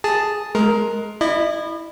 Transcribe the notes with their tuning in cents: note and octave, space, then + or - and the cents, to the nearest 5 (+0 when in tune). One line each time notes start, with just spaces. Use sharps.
G#4 +0 A5 +0
G#3 +25 A#4 +0
E4 +0 D#5 -40